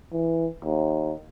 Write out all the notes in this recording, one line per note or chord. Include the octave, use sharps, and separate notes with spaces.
E3
D#2